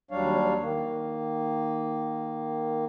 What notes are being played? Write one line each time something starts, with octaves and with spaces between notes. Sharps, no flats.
D#2 F#3 G3 D4 C#5 F5
D#3 A#3